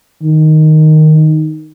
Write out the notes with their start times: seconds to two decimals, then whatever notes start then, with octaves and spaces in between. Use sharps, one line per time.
0.23 D#3